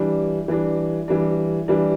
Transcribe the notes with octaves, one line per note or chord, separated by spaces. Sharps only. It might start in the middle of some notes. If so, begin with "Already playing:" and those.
Already playing: E3 G3 D4
E3 G3 D4
E3 G3 D4
E3 G3 D4